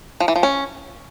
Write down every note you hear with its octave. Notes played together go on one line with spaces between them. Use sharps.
F3
E3
F3
C#4